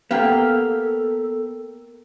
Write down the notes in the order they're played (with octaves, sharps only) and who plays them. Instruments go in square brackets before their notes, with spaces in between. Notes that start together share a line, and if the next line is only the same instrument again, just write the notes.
[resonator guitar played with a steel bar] A#3 G4 F5 [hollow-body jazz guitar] B3 [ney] A4